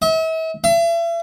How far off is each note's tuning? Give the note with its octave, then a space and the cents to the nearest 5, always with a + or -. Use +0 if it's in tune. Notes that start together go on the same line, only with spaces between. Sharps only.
E5 -40
E5 +40